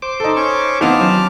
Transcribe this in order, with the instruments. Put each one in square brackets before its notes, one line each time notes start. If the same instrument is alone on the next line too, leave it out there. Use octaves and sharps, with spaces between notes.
[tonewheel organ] C5 D6
[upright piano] D#4 A4
[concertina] C#4 C#6
[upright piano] E3 B3 C4 [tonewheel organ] D#4 F5 [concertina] A5 D6 F6
[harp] D#2 F#3 C#4